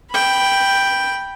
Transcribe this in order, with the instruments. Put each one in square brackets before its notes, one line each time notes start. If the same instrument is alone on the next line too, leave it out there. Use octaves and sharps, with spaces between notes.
[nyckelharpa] G5 B5